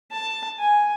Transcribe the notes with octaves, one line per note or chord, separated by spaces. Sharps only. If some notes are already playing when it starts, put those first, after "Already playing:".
A5
G#5